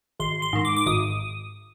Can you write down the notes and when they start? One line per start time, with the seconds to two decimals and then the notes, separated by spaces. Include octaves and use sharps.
0.20 G#1 C6
0.42 C6
0.53 G#2 D#3
0.65 D6
0.77 D6
0.86 G#1 D#6